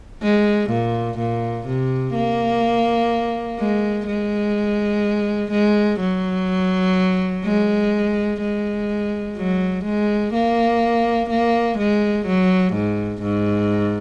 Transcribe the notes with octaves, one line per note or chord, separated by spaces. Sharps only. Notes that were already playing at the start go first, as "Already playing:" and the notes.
G#3
A#2
A#2
C3
A#3
G#3
G#3
G#3
F#3
G#3
G#3
F#3
G#3
A#3
A#3
G#3
F#3
G#2
G#2